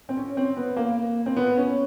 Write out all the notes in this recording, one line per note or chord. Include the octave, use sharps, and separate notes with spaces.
C4
C#4
C4
B3
A#3
C4
B3
C#4